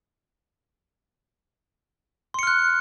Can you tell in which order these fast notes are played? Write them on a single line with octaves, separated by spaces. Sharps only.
C6 C#7 F6 F#6